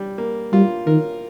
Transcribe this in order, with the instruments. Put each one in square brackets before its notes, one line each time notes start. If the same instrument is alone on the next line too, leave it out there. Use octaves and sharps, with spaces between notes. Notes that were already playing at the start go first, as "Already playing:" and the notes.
Already playing: [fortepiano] G3
A#3
[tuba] G3 [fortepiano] F4
[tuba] D#3 [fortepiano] A#4